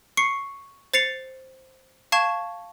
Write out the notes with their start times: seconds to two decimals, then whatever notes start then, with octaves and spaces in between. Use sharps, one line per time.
0.17 C#6 C7 C#7
0.94 C5 A6 C7 C#7 F7
2.12 F5 A5 C#6 G#6 E7